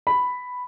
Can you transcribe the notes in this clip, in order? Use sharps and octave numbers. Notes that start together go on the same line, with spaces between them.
B5